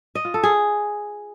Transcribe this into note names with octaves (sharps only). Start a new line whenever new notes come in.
D#5
F4
A4
G#4